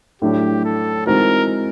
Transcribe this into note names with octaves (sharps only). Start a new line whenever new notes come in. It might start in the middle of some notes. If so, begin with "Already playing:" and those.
A2 F#3 A3 D4 G4
A4
E3 G#3 C4 D#4 F#4 A#4